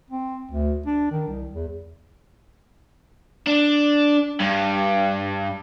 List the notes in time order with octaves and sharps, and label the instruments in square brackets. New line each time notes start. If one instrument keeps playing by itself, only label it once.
[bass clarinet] C4
D2
D4
D#3
C2
E2
[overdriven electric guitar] D4
G2